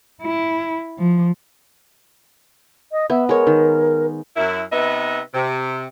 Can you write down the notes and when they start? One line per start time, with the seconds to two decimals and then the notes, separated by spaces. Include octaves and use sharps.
0.22 E4
0.98 F3
2.92 D#5
3.10 B3 E5
3.29 G#3 A#4 C#5
3.47 D#3
4.36 F#2 E4
4.72 C3 B3 D#4 B4 D#5 E5
5.34 C3